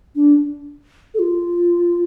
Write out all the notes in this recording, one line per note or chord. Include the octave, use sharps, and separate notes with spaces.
D4
A4
F4